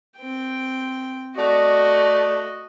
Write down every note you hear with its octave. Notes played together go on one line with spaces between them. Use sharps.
C4 G5
A3 F#4 D5 D#5